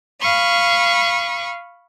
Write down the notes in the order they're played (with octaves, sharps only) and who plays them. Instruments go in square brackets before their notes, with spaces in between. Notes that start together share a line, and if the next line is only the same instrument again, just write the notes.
[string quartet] F5 B5 C#6 D#6